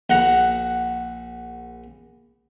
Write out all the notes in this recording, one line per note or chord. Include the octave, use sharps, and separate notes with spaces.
A#1 F#5 A#5